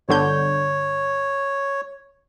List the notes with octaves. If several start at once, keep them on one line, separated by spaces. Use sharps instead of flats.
G1 D3 C#5 G6